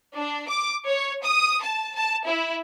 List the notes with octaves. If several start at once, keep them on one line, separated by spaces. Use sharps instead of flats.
D4
D6
C#5
D#6
A5
A5
E4